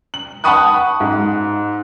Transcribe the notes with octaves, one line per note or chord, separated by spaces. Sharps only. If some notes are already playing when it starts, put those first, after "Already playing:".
F#7
F#5 A5 B5 C#6 D#6 F#6
G#2